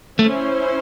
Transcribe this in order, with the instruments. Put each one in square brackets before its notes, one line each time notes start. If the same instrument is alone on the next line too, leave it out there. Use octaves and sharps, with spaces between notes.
[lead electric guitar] A3 [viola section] C#4 E4 C5